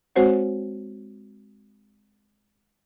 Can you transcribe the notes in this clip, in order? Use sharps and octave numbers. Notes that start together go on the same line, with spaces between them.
G#3 C4 F#4 C5 C#5 F#5